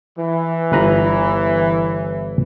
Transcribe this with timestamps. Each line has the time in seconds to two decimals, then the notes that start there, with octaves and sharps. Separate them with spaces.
0.17 E3
0.72 G1 B4 A#5